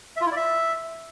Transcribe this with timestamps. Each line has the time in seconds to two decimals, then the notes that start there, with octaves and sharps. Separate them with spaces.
0.16 E5
0.21 F4
0.26 E4
0.31 D5
0.36 E5